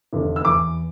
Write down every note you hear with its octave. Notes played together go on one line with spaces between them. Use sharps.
F1 E2 D3
E6
E2 E3 D6